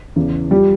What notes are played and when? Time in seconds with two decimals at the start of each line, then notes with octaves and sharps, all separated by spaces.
0.16 E2 C#3 E3
0.51 F3 G3 G4